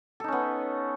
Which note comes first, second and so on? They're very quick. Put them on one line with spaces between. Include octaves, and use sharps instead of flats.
A4 D#4 C#4 B3